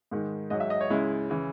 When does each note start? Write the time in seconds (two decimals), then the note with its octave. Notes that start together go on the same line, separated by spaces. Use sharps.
0.11 G#2 D#3 G#3
0.50 G#2 F#3 D#5
0.60 E5
0.70 D#5
0.81 C#5
0.90 C#2 C#3 G#3 E4
1.30 C#3 E3